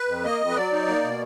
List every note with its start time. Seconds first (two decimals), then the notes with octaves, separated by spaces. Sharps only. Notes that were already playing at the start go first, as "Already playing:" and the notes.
Already playing: B4
0.08 F2
0.24 A#3 D#5
0.40 F2
0.50 B4
0.56 F#3 D5
0.72 D#4
0.88 A#3
1.04 B2